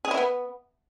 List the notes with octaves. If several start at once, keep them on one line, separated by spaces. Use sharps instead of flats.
G#4
E4
B3